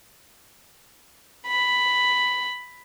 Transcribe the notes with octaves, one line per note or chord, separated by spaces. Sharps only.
B5